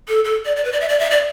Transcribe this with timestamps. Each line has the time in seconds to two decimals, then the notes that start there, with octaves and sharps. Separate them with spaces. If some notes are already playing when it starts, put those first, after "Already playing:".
0.08 A4
0.25 A4
0.45 D5
0.56 D5
0.65 B4
0.72 D5
0.81 E5
0.89 D5
0.99 E5
1.11 D5